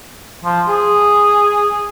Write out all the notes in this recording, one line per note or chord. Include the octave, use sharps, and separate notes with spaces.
F3
G#4